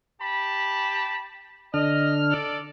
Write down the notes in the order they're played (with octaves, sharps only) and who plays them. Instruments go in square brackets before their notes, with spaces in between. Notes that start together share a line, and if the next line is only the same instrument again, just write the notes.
[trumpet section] G4 A5 B5
[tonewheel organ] D3 D4 F6 [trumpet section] D#5
[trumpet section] A4 D5